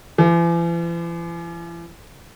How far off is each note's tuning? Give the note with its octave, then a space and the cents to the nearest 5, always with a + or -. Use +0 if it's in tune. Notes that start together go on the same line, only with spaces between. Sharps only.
E3 +45